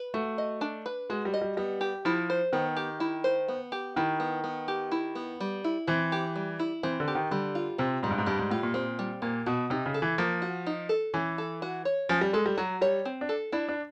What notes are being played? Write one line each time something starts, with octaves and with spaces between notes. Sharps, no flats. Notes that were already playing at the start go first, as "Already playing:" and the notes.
Already playing: B4
A3 F#4
D#5
D4
B4
G#3 F#4
G3
D#5
G3
G3 B3
G4
F3 E4
C5
D#3 B3
G4
E4
C5
B3
G4
D#3 E4
B3
B3
G4
E4
B3
G3
E4
E3 C4
G4
G3
E4
E3 C4
D3
G4
D#3
D3 G3
F4
C3 C4
G#2 G3
G2
G#2
G2 G3
G#2
A2 F4
A#2
A#2 C4
G3
A#2 A#3
B2 F#4
C3 D#4
C#3
A4
E3
F3 A#3
F#4
D#4
A4
E3 C#4
A4
F#4
C#5
F3 C#4
G3
G#3 A4
G3
F#3 F#4
G3 C#5
C4
D4
A4
D4 E4
D4